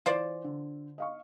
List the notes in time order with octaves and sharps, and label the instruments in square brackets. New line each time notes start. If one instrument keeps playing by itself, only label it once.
[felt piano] E3 [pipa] F4 C5 D5
[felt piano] D3
D#5 F5 C#6